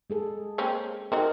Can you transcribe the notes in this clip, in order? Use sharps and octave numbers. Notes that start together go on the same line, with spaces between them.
G#3 G#4 A4
A#3 C4 C#4
C4 D#4 F#4 A#4